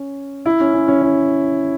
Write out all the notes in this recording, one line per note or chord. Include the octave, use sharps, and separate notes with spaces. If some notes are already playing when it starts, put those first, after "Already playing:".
Already playing: C#4
E4
C#4
C#4
C#4
C#4